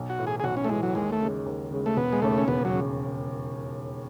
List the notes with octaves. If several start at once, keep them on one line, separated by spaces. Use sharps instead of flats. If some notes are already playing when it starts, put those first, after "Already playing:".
Already playing: B1
F#4
A2 E3
G#4
G#4
B1 F#4
C#4
A3
A2 E3 G#3
F#3
D#2 G#3
A3
C#3 G#3
D#2
C#3 G#3
A3
E1 B3
G#3
D#2 C#3 A3
C#4
E1 B3
F#3
C#3